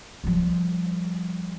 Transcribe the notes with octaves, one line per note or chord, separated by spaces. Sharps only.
F3 G3